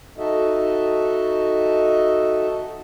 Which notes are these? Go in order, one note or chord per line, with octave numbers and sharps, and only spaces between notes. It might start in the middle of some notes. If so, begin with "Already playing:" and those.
D#4 F#4 A4 D#5 E5